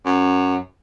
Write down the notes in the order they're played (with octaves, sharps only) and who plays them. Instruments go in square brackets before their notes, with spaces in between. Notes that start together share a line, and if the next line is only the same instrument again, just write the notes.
[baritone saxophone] F#2